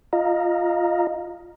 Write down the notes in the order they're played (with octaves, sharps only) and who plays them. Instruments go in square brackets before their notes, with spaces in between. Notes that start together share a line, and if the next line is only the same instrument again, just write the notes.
[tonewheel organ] F4 D#5 F5 A#5